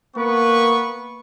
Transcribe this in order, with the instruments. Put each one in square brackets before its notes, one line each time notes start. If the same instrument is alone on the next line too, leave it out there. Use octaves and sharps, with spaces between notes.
[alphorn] A#3 [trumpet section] B3 B4 C#6